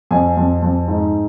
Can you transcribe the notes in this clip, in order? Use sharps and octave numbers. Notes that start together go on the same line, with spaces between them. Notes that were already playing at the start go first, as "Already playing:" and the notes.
F2 G#5
F2
F2
G#2